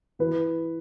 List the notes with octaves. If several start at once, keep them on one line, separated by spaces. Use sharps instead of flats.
E3 B4